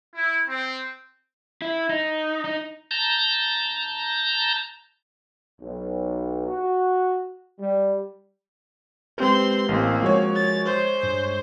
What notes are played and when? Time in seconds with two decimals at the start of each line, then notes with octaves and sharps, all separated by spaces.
0.14 E4
0.48 C4
1.62 E4
1.90 D#4
2.45 D#4
2.91 A5 A#5 G6
5.60 B1
6.48 F#4
7.59 G3
9.18 G#3 C4 G4 B4 C6
9.69 A1 A#3 C4
10.02 F3 G#3 F#4 A#4 C#5
10.35 A6
10.65 C5
11.03 G2